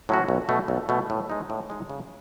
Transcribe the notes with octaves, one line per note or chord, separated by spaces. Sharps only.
A2 F#3 C#4 F#4
B1
B2 A3
B1
B2 A3
A2
G#3 D#4
A2
G#3 D#4
C#3